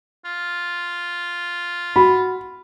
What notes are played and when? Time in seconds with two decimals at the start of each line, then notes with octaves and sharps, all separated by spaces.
0.25 F4
1.96 F#4 B5